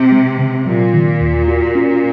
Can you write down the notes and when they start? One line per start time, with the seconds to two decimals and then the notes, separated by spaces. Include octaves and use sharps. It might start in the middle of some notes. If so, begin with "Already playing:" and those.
Already playing: C3 C4
0.12 G#3
0.38 C#3
0.66 A#2 F#3
0.94 D#3
1.21 D#2
1.48 F#4
1.75 C#4